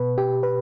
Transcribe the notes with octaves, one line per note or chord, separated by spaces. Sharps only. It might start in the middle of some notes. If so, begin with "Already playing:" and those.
Already playing: B2 B4
G4
B4